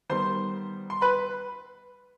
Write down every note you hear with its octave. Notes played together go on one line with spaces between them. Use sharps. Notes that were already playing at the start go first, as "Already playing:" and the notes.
D#3 G3 B3 C5 C6
C6
B4 B5